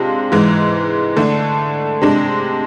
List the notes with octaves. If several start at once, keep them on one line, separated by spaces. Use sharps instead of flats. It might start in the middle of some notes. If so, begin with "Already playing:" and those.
Already playing: C3 G#3 D4 F4
G#2 E3 G#3
D3 A3 D4
C3 G#3 D4